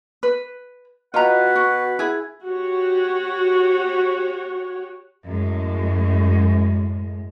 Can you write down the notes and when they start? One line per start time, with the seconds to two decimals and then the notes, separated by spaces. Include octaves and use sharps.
0.23 B4
1.14 B2 F4 B4 F#5 A#5
1.56 F#4
1.99 E4 G#4
2.45 F#4 G4 C#5
5.26 F#2 A2 G#3